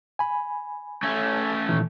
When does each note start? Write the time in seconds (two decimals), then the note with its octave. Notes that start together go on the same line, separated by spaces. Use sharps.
0.19 G#5 B5
1.03 A3 C#4
1.69 A#2 D#3 E3